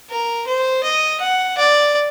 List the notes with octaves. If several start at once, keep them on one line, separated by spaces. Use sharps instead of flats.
A#4
C5
D#5
F#5
D5